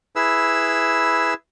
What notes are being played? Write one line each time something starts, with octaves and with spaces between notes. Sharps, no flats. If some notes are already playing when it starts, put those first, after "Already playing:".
E4 G#4 B4 E6